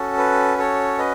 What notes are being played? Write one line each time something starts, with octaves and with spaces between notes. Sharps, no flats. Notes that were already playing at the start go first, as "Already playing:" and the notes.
Already playing: C#4 F#4 A4
B4
A4 C#5
B4 D#5